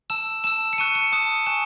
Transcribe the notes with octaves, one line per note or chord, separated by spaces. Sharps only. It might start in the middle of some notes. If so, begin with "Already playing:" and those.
A5 E6 E7
A5 E6 E7
C#7
A5 C#6 F#6 D#7
C#7
A5 D#6 F#6
G#5 C#6 F#6 E7